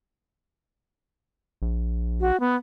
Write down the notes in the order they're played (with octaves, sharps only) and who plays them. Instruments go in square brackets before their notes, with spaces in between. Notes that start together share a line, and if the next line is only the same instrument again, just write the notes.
[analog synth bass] A#1
[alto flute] F#4
B3